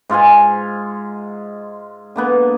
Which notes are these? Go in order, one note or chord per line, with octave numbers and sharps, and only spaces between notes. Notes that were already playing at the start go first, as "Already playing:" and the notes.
G#2 F4 F5 G#5
D3 A#3 B3